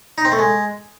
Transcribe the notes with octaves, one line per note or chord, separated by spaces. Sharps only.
D#4
C4
A3
G#3